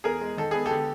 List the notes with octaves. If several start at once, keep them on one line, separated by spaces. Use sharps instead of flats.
E2 G#4 A#4
G#3
D#3 A4
B3 G#4
G4 A4
D3